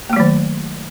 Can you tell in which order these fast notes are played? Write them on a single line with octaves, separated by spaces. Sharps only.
A#3 A3 F#3 D#3